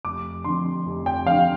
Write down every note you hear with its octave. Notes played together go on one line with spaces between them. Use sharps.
F1 D6
F2 D3 C6
F1
G5
F2 D3 F5